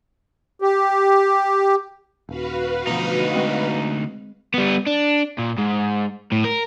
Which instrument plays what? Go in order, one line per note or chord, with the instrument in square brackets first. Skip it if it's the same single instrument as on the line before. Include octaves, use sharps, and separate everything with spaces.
[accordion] G4
[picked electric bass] D#1 [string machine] F#4 B4 F5
[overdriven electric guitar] D2 D#4 [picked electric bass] B2 F3
[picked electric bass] G#3 C4
[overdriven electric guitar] G3 B3
D4
A#2
G#2
A2
A#4